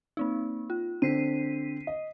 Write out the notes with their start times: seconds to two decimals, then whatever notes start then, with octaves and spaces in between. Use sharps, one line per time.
0.17 A#3 C4 D#4
0.70 F4
1.02 D3 C4 B6 C7 D#7
1.87 D#5